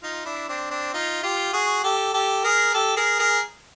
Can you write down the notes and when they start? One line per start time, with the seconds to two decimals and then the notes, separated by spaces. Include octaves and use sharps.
0.03 D#4 F4
0.25 D4 E4
0.49 C4 D4
0.71 C4 D4
0.93 D#4 F4
1.23 F4 G4
1.53 F#4 G#4
1.84 G4 A4
2.14 G4 A4
2.44 G#4 A#4
2.74 G4 A4
2.96 G#4 A#4
3.19 G#4 A#4